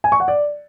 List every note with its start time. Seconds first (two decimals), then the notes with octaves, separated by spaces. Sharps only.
0.04 G#5
0.12 C#6
0.20 F#5
0.28 D5